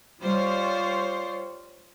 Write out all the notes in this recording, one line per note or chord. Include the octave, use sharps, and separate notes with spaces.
G3 F4 C5 C#5